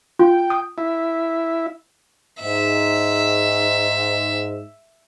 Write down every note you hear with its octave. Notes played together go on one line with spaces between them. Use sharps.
F4 G5
D#6
E4 E5
G#2 E5